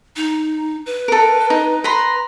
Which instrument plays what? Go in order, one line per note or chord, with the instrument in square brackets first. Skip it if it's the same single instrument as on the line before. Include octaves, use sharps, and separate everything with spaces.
[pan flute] D#4
B4
[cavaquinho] A4 A#4
D#4
B4 A#5 C6